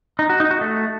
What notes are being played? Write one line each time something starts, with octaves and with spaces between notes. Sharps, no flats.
D#4
F#4
D#4
F#4
A3